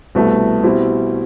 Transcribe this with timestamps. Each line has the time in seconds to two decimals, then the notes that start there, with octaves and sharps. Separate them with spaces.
0.15 C2 B2 A3 E4 B4
0.63 B2 G3 C4 E4